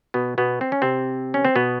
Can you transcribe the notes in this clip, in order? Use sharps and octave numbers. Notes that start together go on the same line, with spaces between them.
B2 B3
B2 B3
C4
C#4
C3 C4
C#4
C4
B2 B3